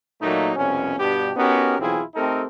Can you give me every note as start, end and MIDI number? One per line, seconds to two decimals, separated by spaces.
0.22 0.52 46
0.22 0.52 54
0.22 0.52 57
0.22 0.52 58
0.22 0.52 63
0.56 0.97 36
0.56 0.97 41
0.56 0.97 47
0.56 0.97 61
0.99 1.31 43
0.99 1.31 47
0.99 1.31 59
0.99 1.31 62
0.99 1.31 67
1.37 1.77 59
1.37 1.77 61
1.37 1.77 63
1.37 1.77 66
1.37 1.77 67
1.37 1.77 70
1.79 2.02 35
1.79 2.02 52
1.79 2.02 60
1.79 2.02 64
1.79 2.02 65
1.79 2.02 68
2.15 2.46 57
2.15 2.46 60
2.15 2.46 63
2.15 2.46 67
2.15 2.46 69
2.15 2.46 70